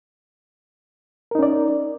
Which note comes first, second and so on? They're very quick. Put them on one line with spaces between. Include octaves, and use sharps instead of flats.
A#4 D#4 C#4 D5